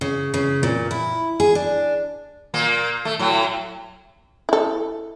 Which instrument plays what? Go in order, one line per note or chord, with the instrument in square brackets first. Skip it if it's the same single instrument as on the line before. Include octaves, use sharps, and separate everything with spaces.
[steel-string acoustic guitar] C#3
C#3
A#2
E4
G#4
D4
[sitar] A#2 A#3
A3
A2 F#3
[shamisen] E4 A4